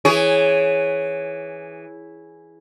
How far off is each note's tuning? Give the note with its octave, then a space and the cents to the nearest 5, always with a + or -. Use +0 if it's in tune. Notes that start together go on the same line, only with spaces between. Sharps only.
E3 +0 G#4 +5 C#5 +0